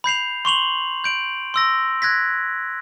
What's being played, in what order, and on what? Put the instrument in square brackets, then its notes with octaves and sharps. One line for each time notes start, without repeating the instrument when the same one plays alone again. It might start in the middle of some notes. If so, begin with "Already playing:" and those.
[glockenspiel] B5 G6 C7 F7
C6 C#6 F7 F#7
G6 D7 F#7
C6 E6 A#6
F#6 G#6 A#6 B6